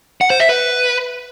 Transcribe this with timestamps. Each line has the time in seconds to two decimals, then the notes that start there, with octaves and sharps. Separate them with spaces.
0.21 F#5
0.30 C5
0.40 E5
0.49 B4